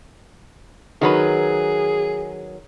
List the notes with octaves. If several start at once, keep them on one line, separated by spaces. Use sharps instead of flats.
D#3 F#3 G#4 B4